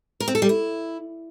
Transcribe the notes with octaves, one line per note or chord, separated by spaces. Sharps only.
A#4
C4
A4
G3
E4